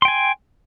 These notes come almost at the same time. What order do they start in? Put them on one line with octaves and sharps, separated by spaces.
C6 G5 G#5